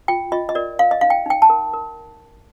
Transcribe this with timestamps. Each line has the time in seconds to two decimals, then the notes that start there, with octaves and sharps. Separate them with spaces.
0.08 F4 G5
0.32 F4 D#5
0.49 D#5
0.55 A#4 D5
0.79 A#4 F5
0.91 D#5
1.01 D#4 F5
1.10 G5
1.26 D#4 G5
1.42 A5
1.50 A#4
1.73 A#4